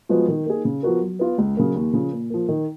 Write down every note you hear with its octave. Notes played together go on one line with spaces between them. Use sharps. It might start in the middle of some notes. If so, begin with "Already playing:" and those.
F3 G#3 B3 F#4
D#3
A#3 D#4 G#4
C#3
F3 B3 F#4 A#4
F#3
B3 F4
C#2
C#3 F#3 A#3
D#2
C#3 F3
A#2
F3 A#3
D#3